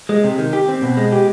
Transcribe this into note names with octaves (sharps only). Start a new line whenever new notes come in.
G#3
C3
D#3
G4
C4
B2
G#3
G4